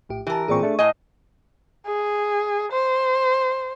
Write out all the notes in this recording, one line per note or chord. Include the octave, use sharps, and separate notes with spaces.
A#1 A2 G4
E3 G4 A#4 A5
A1 A#2 C4 G#4 D5 C#6
A3 D4
A2 D#5 G#5
G#4
C5